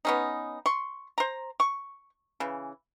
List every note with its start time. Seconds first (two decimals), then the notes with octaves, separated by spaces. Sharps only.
0.05 B3 C#4 D#4
0.66 C6 C#6
1.18 C5 A#5
1.60 C#6
2.40 C#3 E3